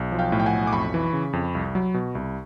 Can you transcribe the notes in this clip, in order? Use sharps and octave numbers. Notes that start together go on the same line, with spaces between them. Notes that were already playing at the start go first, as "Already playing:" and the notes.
Already playing: B1
F3
F5 G5
A2
G5
F#5 G#5
B1
D6
F2 B5 C#6
E3
C#3
F2
C2
F#3
B2
C2